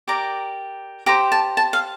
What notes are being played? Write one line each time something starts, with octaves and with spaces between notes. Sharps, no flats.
G4 A#4 D5 A#5
G4 C5 A#5
A5
A5
F5